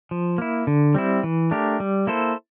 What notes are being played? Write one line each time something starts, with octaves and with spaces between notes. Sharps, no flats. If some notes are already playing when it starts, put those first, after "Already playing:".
F3
A#3 E4
D3
G3 C4 E4
E3
A3 D4 G4 A#4
G3
A#3 E4 A4 C5